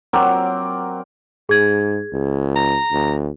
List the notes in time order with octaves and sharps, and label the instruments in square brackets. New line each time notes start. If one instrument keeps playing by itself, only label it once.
[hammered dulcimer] F#3 C4 A#4 D5
[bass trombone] G#2 [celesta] G#4 G#6
[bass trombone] C#2
[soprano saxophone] A#5
[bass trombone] D2